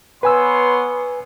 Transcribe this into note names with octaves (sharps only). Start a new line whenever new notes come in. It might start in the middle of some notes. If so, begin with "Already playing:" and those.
B3 B4 C#5 G#5 C6 E6